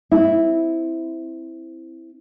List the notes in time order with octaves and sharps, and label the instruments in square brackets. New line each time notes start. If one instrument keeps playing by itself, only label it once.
[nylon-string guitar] C4 E4